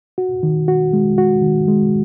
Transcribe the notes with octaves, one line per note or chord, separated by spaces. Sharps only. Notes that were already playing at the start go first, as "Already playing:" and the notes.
F#4
D#3
F#4
G#3
F#4
D#3
G#3